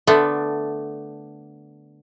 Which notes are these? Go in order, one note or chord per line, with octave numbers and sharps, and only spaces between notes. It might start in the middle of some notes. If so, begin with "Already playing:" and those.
D3 A3 B3 D4